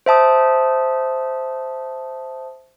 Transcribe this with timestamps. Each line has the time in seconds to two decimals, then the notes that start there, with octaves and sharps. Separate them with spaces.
0.06 C5 E5 A5 D#6